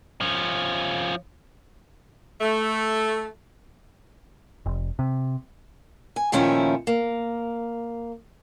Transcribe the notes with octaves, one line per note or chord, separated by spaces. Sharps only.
F3 C#4
A3
F1
C3
G#5
A#2 D#3 F3 A3 C#4 E4
A#3